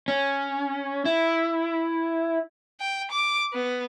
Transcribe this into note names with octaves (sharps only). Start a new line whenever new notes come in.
C#4
E4
G5
D6
B3